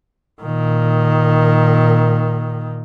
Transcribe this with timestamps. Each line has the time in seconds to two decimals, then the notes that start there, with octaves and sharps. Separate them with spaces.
0.42 A#2 D#3